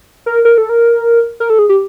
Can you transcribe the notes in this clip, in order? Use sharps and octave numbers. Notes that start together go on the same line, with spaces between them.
A#4
A#4
A4
A#4
A#4
A4
G#4
G4